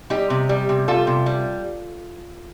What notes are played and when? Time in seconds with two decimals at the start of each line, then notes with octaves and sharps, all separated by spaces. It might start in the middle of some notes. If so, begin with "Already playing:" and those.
0.10 G3 D#4 G4
0.30 C3
0.49 G3
0.69 C3
0.88 G3 F4 A4
1.07 C3
1.26 G3